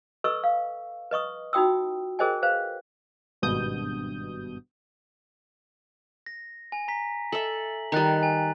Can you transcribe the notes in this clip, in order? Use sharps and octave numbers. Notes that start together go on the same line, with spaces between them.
A4 B4 D#5 C#6 E6
F5
B4 D#5 C#6 D#6
D#4 F4 F#4 G5 D#6 E6
G#4 A#4 C5 D#5 G5 G#5
B4 C5 F5
G#1 G2 B2 D#6 G6
A#6
G#5
A#5 B6
A4 E5 F#7
D#3 G3 A#5 F#6 A6
G#5